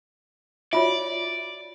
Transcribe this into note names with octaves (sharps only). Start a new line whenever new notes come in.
F4 F#4 C#5 D5 E5 B5